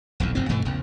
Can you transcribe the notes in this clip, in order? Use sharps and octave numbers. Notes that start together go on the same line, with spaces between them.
D#1 B1 E2
F1 G#2 F#3 C4
G2 B2 E3 A3
A#1 E2 C#3